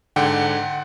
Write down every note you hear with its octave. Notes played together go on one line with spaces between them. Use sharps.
G#2 D3 F#5 G5 F#6